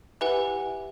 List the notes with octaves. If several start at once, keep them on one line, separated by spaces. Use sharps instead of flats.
E3 G4 B4 F#5